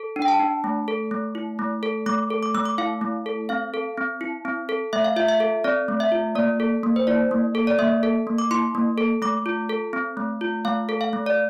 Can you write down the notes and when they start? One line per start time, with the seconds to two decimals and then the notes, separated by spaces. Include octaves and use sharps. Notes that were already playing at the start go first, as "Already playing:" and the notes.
Already playing: A4
0.16 D4
0.22 G5
0.28 A5
0.39 D4
0.64 A3
0.88 A4
1.11 A3
1.35 E4
1.59 A3
1.83 A4
2.06 A3 D6
2.30 A4
2.43 D6
2.54 A3 E6
2.65 D6
2.78 E4 F5
3.01 A3
3.26 A4
3.49 C4 F5
3.74 A4
3.97 C4
4.21 E4
4.45 C4
4.69 A4
4.93 A3 E5
5.04 F5
5.16 F4 E5
5.28 E5
5.40 A4
5.64 C4 D5
5.88 A3
6.00 E5
6.12 F4
6.35 A#3 D5
6.60 A4
6.83 A#3
6.96 C5
7.07 E4 D5
7.31 A#3
7.55 A4
7.67 D5
7.79 A#3 E5
8.03 A4
8.27 A#3
8.38 D6
8.51 E4 C6
8.75 A#3
8.98 A4
9.22 A3 D6
9.46 F4
9.69 A4
9.93 C4
10.17 A3
10.41 F4
10.65 A3 F5
10.89 A4
11.01 F5
11.13 A3
11.26 D5